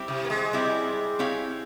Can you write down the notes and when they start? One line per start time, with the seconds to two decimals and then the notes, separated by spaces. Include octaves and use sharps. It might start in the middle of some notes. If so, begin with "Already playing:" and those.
Already playing: G3 C4 E4 G4
0.08 C3
0.25 A#3
0.30 G#3
0.53 G3 C4 E4 G4
1.19 C4 E4 G4 C#5 F5